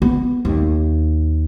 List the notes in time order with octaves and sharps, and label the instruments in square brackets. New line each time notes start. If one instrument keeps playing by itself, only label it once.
[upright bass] B3
D#2